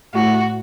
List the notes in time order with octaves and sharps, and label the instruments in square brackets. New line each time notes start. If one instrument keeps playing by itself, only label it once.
[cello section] A2 [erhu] F#4